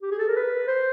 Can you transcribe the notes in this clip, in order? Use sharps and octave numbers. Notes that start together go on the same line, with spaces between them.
G4
G#4
A4
A#4
B4
C5